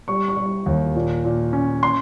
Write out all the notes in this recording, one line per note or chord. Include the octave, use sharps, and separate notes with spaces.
G3 C#6
C#6
G3
D#2
A#2
A#2
C#4
C6